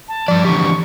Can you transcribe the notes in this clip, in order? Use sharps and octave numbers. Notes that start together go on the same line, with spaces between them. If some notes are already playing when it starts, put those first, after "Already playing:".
A5
G2 F3 D5
D3 E3 G4 C#6